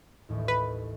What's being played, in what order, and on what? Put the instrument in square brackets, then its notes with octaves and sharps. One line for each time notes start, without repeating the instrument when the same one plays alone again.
[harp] A1 D#2 A2
[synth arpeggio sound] B4